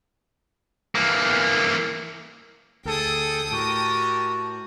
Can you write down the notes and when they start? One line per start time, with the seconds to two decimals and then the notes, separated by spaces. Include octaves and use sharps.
0.95 E3 A#3
2.85 D2 G#4 A4 G5 D#6
3.51 A2 F#4 G4 A#4 A5